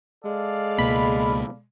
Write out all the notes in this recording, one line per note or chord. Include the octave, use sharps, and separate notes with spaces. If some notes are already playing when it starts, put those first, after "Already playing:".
G#3 A4 D5 F5
C#2 B2 A#3 B5